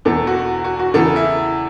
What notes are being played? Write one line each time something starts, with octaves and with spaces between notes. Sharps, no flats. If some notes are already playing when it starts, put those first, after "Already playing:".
E2 B2 A4
F#4
F#4
F#4
E2 C#3 E3 A4
E4